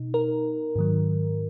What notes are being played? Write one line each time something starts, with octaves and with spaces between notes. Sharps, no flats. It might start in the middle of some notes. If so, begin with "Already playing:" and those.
Already playing: B2 D#4
A#4
G#2 D#3 F#3